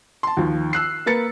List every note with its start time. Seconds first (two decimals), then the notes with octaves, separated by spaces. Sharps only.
0.23 A5 C6
0.37 D#2 F3
0.73 E6 F#6 C7
1.06 A#3 B4 A6 C#7